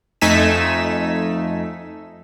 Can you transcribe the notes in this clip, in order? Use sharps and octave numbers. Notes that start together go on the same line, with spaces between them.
F2 A3 D#4 G#5 B6 E7